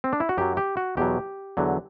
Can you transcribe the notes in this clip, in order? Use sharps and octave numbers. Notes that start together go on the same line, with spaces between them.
C4
D4
E4
F#4
F#2 F#3 G4
G4
F#4
E2 B2 F#3 G4
E2 D3 F#3